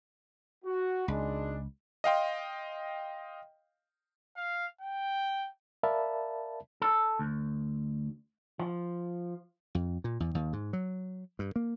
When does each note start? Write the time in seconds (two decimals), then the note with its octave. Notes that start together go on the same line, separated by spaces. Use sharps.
0.64 F#4
1.08 G#1 C#2 G#3 D4
2.04 D#5 F5 G5 C6
4.36 F5
4.81 G5
5.83 A#4 D5 E5 F5 A5 B5
6.82 A4
7.19 D2
8.59 F3
9.75 F2
10.04 A#2
10.20 E2
10.35 D#2
10.53 G#2
10.73 F#3
11.39 G2
11.56 A#3